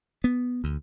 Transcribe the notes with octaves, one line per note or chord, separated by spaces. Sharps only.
B3
D2